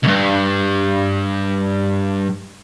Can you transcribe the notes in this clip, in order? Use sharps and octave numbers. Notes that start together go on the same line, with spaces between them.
C2 G2